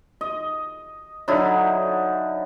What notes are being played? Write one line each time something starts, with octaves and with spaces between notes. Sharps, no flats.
D#5
D3 F#3 D#4 E4